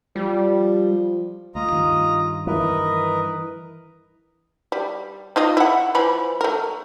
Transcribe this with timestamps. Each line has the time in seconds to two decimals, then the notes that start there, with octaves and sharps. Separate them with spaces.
0.16 F3 G3
1.55 D2 A3 F4 D#5 A#5
1.72 G2 D#3
2.47 E3 A#4 B4 D#5
4.72 G3
5.36 D#4 F4 D#5
5.57 E4 F#5
5.95 E3 F3 B5
6.41 A3 A#4